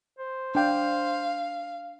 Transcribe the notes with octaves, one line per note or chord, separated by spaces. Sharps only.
C5
D4 F5 G5